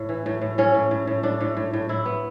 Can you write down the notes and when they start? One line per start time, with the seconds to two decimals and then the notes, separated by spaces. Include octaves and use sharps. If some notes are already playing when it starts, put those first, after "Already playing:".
Already playing: A2
0.09 E3
0.26 A2
0.42 A2
0.58 A2 C#4
0.74 A2
0.91 A2
1.07 A2
1.23 A2 D4
1.41 A2
1.57 A2
1.73 A2
1.89 A2 E4
2.05 B3